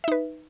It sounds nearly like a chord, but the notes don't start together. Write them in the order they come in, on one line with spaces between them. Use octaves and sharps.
E5 D#4 B4